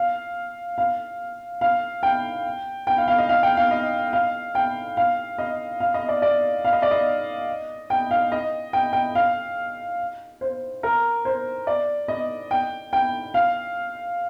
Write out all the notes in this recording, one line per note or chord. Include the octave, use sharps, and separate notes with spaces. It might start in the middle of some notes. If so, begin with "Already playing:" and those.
Already playing: F5
F5
F5
G5
G5
F5
F5
D#5
F5
G5
F5
D#5
F5
G5
F5
D#5
F5
D#5
D5
D5
F5
D#5
D5
D#5
G5
F5
D#5
G5
G5
F5
C5
A#4
C5
D5
D#5
G5
G5
F5